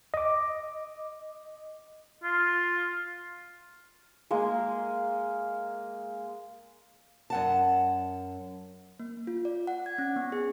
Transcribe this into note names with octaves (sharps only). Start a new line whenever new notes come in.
D#5 D6
F4
G#3 A#3 A#4
F#2 F#5 A5
A#3
F4
D5
F#5
G#6
C#4
B3
G#4